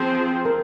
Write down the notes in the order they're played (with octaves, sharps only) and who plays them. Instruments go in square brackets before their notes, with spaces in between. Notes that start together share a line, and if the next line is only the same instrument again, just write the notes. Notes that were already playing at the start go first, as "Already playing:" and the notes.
Already playing: [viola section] F3 C4 G#4 C5
[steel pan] A#4